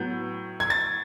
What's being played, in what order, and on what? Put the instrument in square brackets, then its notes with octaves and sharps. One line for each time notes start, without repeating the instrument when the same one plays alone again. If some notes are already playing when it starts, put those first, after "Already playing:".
Already playing: [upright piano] A2 F#3 B3 [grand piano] G6
[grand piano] G#6
A6